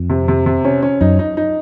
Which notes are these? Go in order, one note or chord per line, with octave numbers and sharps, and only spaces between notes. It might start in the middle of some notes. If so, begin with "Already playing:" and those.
Already playing: F2
C3
C3
C3
C#4
C#4
F#2 D#4
D#4
D#4